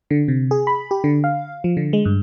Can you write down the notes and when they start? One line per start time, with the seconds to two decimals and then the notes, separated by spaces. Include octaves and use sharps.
0.11 D3
0.28 C3
0.51 G#4
0.67 B5
0.91 G4
1.04 D3
1.24 F5
1.64 F3
1.77 D3
1.93 G#3
2.05 G2